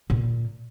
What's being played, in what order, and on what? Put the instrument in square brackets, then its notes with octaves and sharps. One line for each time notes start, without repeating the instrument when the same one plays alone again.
[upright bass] A#2